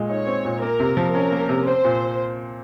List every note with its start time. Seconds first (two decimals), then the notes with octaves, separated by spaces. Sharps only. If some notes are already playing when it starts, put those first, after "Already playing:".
Already playing: A#2 G#3
0.09 D#4 C#5
0.27 C4
0.45 A#2
0.62 A#3 A#4
0.80 C3
0.97 F3
1.14 C#4 A#4
1.32 A#3
1.49 C3
1.67 C4 C5
1.84 A#2